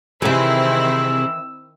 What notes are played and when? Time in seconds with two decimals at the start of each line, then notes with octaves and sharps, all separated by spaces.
0.22 C3 D#3 E3 C4 E4 G#4 E5 E6